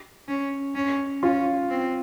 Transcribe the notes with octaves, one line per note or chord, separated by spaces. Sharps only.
C#4
C#4
C#4 F4
C4